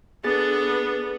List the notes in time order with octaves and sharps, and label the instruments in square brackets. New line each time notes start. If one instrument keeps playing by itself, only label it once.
[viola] B3 [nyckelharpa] D4 A4 [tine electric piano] G#4 A6